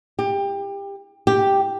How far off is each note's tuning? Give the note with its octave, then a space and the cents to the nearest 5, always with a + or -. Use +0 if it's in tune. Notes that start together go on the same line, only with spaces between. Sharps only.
G4 +25
G4 +0